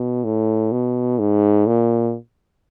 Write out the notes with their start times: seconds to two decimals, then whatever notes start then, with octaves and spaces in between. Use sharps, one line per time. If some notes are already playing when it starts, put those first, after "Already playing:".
Already playing: B2
0.24 A2
0.72 B2
1.19 G#2
1.66 A#2